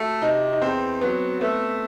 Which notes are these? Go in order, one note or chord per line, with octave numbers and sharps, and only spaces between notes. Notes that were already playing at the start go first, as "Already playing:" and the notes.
Already playing: A3 F#4
C3 D#4
D#4
E2 C4
F#3 B3
A3 B3